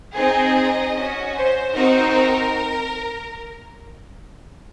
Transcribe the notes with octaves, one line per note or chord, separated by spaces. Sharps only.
C4 D#4 G#4 D#5
C#4 F#4
C5
C4 D#4 F#4 A#4
A#4